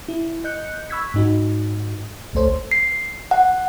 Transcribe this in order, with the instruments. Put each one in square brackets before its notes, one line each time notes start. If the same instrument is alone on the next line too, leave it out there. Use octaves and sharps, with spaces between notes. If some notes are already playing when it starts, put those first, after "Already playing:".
[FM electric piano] E4
D#5 F#6 G6 C#7
B5 C#6 E6 F#6 G#6 B6
G#2 D#4 F#4
G#1 D2 A3 A4 C5 C#5
[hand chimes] C7
F#5